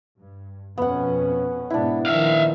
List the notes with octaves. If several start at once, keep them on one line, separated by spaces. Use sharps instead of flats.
G2
F2 B2 B3 C#4 F#5
G#2 B2 B3 D4 E4
A#1 D#3 F3 E5 F5